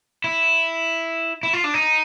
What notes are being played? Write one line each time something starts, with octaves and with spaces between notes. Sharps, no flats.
E4
E4
F4
D4
D#4